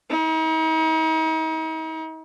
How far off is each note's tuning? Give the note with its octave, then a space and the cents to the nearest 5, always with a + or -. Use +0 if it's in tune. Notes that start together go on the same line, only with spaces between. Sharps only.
D#4 +40